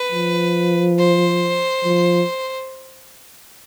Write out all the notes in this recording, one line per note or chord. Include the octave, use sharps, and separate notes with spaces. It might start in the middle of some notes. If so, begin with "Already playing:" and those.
Already playing: B4
F3
C5
F3